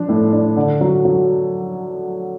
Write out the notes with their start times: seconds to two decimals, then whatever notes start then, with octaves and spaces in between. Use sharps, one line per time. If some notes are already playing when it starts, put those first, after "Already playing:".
Already playing: F3 D4
0.09 A2
0.32 D4
0.56 D3
0.81 F#3
1.05 F#3